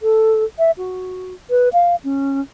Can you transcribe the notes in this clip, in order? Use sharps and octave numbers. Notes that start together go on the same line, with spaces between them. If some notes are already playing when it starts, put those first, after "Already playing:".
A4
E5
F#4
B4
F5
C#4